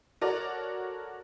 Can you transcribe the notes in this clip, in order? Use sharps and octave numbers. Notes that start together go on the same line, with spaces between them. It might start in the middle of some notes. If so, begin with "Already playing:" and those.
F#4 A4 A#4 C#5 D5